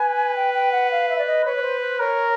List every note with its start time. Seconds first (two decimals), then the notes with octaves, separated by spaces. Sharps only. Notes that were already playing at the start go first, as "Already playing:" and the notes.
Already playing: B4 G#5
0.36 G5
0.54 G5
0.72 F#5
0.91 F5
1.09 E5
1.18 D5
1.26 D#5
1.45 B4 C#5
1.56 C#5
1.63 C5
1.81 C5
1.99 A#4 C#5